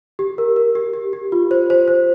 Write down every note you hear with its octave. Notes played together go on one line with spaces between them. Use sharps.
G4
A#4
A#4
G4
G4
G4
F4
C5
C5
C5